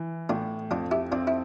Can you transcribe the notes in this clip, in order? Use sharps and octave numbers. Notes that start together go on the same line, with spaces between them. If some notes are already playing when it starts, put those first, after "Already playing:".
Already playing: E3
A2 D4 F4
F2 D4 F4
E4 G4
C4 D4 F4
E4